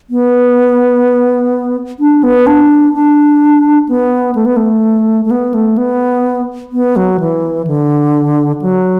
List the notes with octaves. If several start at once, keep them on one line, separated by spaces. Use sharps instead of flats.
B3
D4
B3
D4
D4
B3
A3
B3
A3
A3
B3
A3
B3
B3
F#3
E3
D3
F#3